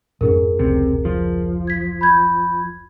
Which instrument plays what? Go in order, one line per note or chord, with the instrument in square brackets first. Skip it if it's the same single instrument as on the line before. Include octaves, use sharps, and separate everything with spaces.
[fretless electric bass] F2 G#2 C#4 [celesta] G#4 A#4
[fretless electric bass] F1 C#2 [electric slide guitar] C3
[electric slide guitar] F3
[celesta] G#6 B6
B5 G6 G#6